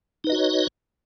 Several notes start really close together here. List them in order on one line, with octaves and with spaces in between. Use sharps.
D#4 B4 D#5 F#4 C#5